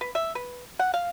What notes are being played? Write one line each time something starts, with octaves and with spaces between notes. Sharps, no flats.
B4
E5
B4
F#5
F5